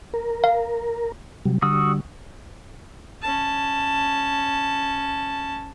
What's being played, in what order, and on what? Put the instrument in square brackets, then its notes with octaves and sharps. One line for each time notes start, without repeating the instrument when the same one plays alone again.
[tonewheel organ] A#4
[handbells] F5
[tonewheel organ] C3 F#3 G3
[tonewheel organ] D3 G3 [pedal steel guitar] F#4 D#6 E6
[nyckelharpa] C#4 A5